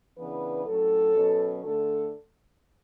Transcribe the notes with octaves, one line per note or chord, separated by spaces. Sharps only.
C#3 E3 B3 D4 B4
A2 F#3 C#4 A4
B2 F#3 C#4
D3 A3 D4 A4